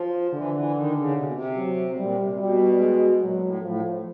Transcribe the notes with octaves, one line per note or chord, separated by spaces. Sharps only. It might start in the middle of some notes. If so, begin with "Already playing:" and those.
Already playing: F3
D3 E3
E3
D#3
C#3
C3
B2
C3
F#3
B2
A#2 G3
C3
C3
B2 G3
G#3
A#2 F#3
A#2
A2
A2 F3